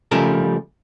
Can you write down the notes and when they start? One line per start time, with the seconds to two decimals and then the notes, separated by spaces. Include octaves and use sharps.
0.11 C#3 F3 G3 A3 A#4